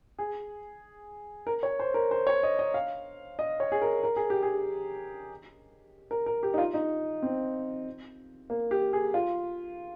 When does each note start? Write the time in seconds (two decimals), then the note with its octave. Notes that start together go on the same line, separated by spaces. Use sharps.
0.18 G#4
1.47 A#4
1.63 C#5
1.80 C5
1.94 A#4
2.11 C5
2.27 C#5
2.43 D#5
2.59 D#5
2.74 F5
3.39 D#5
3.60 C#5
3.72 G#4
3.82 A#4
4.03 A#4
4.16 G#4
4.30 G4
4.43 G#4
6.11 A#4
6.26 A#4
6.43 G4
6.54 D#4
6.58 F4
6.74 D#4
7.22 C4
8.50 A#3
8.71 G4
8.93 G#4
9.14 F4